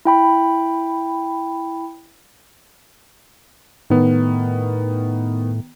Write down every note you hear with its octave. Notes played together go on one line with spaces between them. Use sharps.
E4 G5 B5
A2 D#3 B3